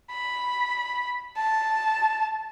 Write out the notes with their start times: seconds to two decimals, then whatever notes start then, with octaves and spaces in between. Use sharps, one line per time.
0.10 B5
1.37 A5